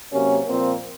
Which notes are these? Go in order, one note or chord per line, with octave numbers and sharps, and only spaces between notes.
C3 F#3 A#3 C#4
A#2 F3 A#3 C4